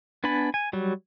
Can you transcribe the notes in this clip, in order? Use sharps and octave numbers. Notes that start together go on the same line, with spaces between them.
B3 D4 G#5 A5 B5
G#5
F#3 G3